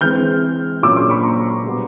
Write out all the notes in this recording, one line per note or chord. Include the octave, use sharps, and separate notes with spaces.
E3 G#3 C4 F6 G6
A#2 F#3 A#3 C#4 D6 E6
C6 D6
B5 C#6
A#5 C6
B2 G3 B3